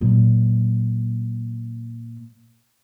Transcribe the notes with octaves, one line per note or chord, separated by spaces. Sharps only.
A#2 F#3